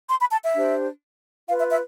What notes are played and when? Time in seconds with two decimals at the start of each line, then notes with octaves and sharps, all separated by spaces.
0.09 C6
0.20 B5
0.32 A5
0.43 E5
0.54 D4 G4 C5
1.47 F4 F5
1.50 B4
1.59 E5
1.70 E5